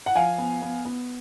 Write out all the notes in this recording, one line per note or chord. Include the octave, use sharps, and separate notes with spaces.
F#5
F3 F5 G#5
B3
B3
B3